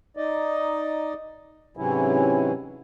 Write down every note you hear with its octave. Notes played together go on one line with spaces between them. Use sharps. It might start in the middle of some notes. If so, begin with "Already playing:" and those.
D#4 D5 D#5
G#2 C3 E3 F#3 C#4 E4